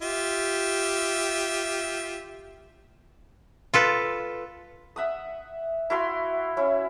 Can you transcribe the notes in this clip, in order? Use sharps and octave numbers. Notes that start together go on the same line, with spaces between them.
F4 G4 E5
F4 A4 B4
E5 F#5 D#6
E4 F#4 F5 C6
C#4 E4